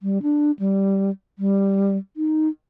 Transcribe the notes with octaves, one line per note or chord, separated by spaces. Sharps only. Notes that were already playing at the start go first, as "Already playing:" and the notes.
G3
D4
G3
G3
D#4